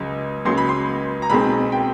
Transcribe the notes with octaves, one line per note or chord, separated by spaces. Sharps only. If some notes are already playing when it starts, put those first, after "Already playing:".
Already playing: C#2 C#3 F#3
C#2 C#3 F#3 C6
B5
C6
A#5
B1 B2 G#3 C4 B5
G5